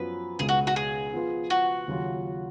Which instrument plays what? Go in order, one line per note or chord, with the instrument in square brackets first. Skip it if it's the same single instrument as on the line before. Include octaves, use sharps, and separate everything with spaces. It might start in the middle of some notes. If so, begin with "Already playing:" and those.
Already playing: [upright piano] F#2 F3 B3 F4 [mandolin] B4
[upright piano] C#2 B2 G#3 [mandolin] G#4
[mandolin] F#4
F#4
G#4
[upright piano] F3 B3 F4 B4
[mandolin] F#4
[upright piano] D#2 C#3 F#3 C#4 F4